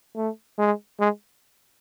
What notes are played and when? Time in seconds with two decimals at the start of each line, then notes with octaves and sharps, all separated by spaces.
0.16 A3
0.59 G#3
1.00 G#3